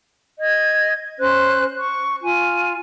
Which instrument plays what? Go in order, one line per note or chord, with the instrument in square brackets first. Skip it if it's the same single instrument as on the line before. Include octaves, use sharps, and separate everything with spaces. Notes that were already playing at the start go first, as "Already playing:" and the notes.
[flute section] D#5 G#6
C#4 C5 F#6
C#6
F4 G#5